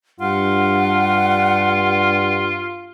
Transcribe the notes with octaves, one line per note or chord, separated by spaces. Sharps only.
G2 F4 F#5